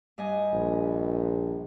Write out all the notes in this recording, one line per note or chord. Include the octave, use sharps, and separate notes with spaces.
G2 D#5 G#5
A#1